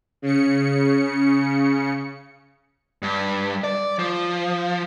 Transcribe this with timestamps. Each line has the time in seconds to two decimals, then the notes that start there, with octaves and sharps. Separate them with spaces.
0.22 C#3 C#7
3.02 G2
3.64 D5
3.99 F3